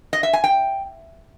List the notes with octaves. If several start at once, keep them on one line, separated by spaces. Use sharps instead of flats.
D#5
E5
G#5
G5